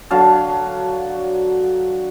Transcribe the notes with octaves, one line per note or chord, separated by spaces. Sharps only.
D3 F#3 F5 A5